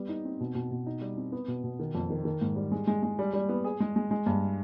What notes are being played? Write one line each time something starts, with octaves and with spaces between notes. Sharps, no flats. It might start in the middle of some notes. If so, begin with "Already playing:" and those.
Already playing: G3 B3
D#4
C4
B2
B2
B2
D#4
G3
C4
B3
B2
B2
D#3
F2
D#3
D#3
G#2
G3
G#3
G#3
G#3
G3
G3
B3
G#4
G#3
G#3
G#3
G2